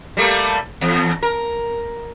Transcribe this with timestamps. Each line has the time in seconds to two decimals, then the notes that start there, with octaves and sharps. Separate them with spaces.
0.17 G3 A3 A#3
0.81 E2
1.23 A#4